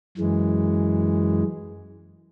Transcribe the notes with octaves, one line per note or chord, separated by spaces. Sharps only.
F#2 E3 G#3